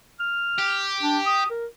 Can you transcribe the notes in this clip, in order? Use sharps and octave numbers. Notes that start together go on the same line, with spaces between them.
F6
G4
D4
D#6
A#4